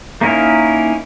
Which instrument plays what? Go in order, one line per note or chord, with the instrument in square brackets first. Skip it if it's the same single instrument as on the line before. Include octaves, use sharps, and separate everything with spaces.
[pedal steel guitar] A#3 C#4 D#4 E4 A#4